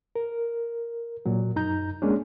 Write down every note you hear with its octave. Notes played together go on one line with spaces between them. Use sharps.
A#4
A#2 F#3
F#2 D#4 A#5 G6
G#3 A#3 C#4 D4